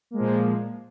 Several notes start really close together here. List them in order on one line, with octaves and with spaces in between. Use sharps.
A#3 G#3 F3 A#2